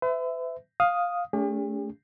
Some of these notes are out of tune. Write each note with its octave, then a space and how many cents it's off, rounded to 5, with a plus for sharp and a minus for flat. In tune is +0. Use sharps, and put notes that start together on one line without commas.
B4 +45 E5 +0
F5 +10 D#6 +0
A3 -10 C#4 +45 G4 +45